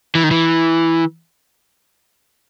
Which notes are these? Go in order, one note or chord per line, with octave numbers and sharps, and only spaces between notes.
E3
D#3
E3